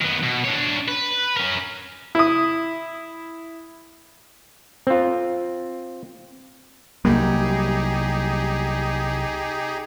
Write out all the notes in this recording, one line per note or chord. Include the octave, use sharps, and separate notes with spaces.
D#3 B3
B2
D4 C#5
B4
C#4 A#4
E4 D#6
C4 F4
C2 F#3 G3 A#3 D#4 G4 G#4